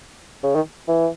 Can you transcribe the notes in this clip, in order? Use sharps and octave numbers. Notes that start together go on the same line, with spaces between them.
C#3
D#3
E3